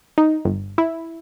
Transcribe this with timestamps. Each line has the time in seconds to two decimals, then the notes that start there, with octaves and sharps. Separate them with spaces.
0.18 D#4
0.45 G1
0.78 E4